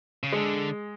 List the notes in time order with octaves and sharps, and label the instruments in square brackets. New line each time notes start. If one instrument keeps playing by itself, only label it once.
[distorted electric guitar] C#3
[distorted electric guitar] D3 [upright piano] G#3